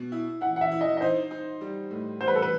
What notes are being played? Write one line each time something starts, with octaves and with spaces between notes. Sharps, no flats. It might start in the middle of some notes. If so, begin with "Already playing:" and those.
Already playing: B2
E4
E4 F#5
F#5
E5
E4
D#5
D#5
D#4 C5
D#4
G3
A2
G3 C5
B4
A4
B4